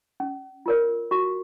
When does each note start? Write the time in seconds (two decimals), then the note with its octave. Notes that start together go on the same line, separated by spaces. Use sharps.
0.20 C#4
0.66 F4 A#4 C#5
1.11 F#4 C#6